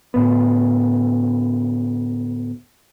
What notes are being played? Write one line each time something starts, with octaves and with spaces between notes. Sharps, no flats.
D2 A2 B3